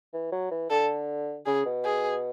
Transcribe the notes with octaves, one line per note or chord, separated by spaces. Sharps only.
E3
F#3
E3
D3 A4
C#3 G#4
B2
G#4